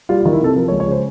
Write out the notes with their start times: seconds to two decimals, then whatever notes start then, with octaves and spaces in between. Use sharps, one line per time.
0.09 G3 F4
0.21 F4
0.25 D#3
0.33 E4
0.41 C3 A4
0.56 F3 A#4
0.68 C#5
0.72 C#2
0.80 C#5
0.88 C#3 C5